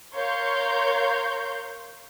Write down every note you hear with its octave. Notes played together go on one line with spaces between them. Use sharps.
A#4 C#5 F5 C6 G6